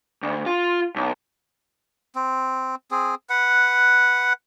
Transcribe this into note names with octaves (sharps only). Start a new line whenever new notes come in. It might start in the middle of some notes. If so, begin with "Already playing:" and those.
D2
F4
B1
C4
C4 G#4
B4 F#5